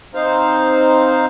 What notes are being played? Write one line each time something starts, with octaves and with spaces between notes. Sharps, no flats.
C4 D#4 C5 F5